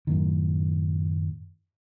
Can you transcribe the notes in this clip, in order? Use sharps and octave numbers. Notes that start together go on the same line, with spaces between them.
F#2 A2 D#3